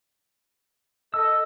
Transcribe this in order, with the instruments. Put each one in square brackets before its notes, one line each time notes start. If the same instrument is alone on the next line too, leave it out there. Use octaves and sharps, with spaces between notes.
[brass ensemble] A4 D#5 [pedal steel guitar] E6